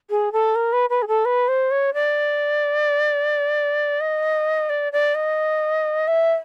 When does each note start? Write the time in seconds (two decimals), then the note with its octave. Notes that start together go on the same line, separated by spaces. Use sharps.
0.10 G#4
0.32 A4
0.55 A#4
0.73 B4
0.90 B4
1.02 G#4
1.08 A4
1.25 B4
1.48 C5
1.71 C#5
1.94 D5
4.01 D#5
4.69 D5
4.92 D5
5.15 D#5
6.07 E5